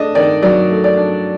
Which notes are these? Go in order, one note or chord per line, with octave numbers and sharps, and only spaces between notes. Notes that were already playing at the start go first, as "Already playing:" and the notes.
Already playing: A3 D4 D#5
D#3 D5
F#3 D5
A3
D5
D4